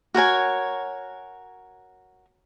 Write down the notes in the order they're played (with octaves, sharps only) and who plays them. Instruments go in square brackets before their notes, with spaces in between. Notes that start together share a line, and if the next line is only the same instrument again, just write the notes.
[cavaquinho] F#4 A#4 C#5 G#5